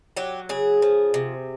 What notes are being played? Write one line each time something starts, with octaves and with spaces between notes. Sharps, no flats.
F#3 G4
C#3 G#4
F3
C3